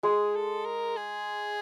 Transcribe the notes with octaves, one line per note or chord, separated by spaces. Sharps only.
G#3 G#4
A4
A#4
G#4